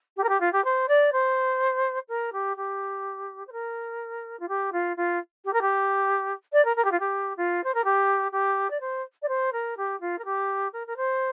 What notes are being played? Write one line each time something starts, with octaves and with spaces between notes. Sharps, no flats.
G4
A#4
G4
F4
G4
C5
D5
C5
A#4
G4
G4
C5
A#4
F4
G4
F4
F4
G4
A#4
G4
D5
A#4
A#4
G4
F4
G4
F4
C5
A#4
G4
G4
D5
C5
D5
C5
A#4
G4
F4
A#4
G4
A#4
A#4
C5